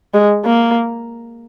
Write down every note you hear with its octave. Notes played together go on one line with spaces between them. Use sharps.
G#3
A#3